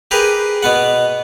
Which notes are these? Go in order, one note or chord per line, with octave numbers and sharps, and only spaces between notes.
G4 G#4 A#4 B4
B2 B3 F#5